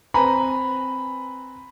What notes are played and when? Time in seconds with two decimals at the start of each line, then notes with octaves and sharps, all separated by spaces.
0.14 C4 B4 G#5 A#5 B5